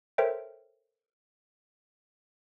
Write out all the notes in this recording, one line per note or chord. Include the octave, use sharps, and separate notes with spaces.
A4 A#4 C5 C#5 E5 G5